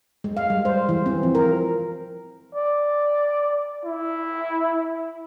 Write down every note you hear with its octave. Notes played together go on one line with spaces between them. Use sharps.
G#3
F5
G3
C5
E3
C4
F3
A#4
D5
E4